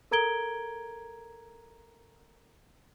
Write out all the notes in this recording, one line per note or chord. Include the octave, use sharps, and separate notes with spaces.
A4 A#4 A#5 G#6 D7 G7